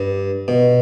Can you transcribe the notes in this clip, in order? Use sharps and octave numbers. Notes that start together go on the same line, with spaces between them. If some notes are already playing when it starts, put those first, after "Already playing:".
Already playing: G2
B2